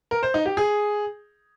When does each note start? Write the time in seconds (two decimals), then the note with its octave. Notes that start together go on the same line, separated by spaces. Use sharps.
0.11 A#4
0.23 C5
0.34 D#4
0.46 G4
0.57 G#4